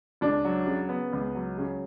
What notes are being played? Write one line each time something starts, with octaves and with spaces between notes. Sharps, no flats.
C#2 D4
F#3
C#3
B3
C#2
F#3
C#3